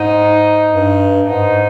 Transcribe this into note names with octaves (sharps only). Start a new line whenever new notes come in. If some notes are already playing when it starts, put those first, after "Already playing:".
Already playing: G#2 D#4
G2
G#2 D#4